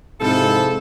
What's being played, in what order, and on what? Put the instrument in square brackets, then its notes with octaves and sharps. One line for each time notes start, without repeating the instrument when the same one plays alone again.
[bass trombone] G#2 [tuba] C3 [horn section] F3 E4 A4